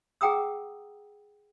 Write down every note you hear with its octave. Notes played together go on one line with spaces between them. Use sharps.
G#4 F#5 G5 A#5 D#6 E6